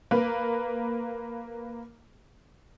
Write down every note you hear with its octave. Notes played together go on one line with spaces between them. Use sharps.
A#3 B4